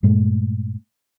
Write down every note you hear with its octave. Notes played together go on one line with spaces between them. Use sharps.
G2 A#2 G#3 A3